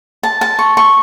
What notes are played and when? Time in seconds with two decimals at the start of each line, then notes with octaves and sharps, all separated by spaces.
0.23 A5
0.41 A5
0.59 C#6
0.77 C#6